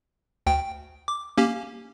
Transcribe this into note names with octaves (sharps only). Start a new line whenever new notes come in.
D2 G5
D6
A#3 C#4 G4